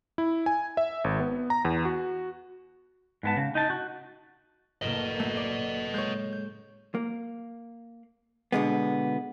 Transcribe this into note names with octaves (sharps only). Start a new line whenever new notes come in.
E4
G#5
E5
G#1
B3
A#5
E2
F#4
G#2 B3 A5
C#3
D#4 A5
F#4
F#1 A2 A#3 B4 D#5
B2 A3
D5
G#3 C#5 G6
G6
A#3
B2 D3 G#3 B3